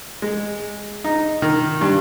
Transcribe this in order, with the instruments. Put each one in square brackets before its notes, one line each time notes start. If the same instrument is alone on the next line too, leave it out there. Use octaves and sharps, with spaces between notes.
[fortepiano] G#3
D#4
D#3
G2